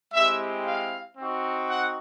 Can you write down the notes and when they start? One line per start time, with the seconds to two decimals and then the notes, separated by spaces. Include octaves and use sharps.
0.13 G#3 C4 E4 G4 E5
0.66 F5
1.18 C4 D#4 F#4
1.70 F#5